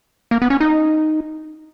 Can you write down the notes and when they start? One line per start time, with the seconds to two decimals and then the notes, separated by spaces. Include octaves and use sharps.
0.31 A#3
0.42 B3
0.50 C#4
0.60 D#4